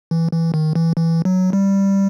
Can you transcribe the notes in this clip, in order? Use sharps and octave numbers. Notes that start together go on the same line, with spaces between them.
E3
E3
D#3
E3
E3
F#3
G3